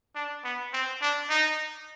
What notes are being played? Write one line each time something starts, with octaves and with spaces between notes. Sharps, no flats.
D4
B3
C4
D4
D#4